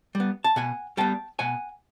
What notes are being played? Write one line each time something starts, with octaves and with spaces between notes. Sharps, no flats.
G3
B3
A5
B2 F#5 G#5
G3 B3 G5 A5
B2 F#5 G#5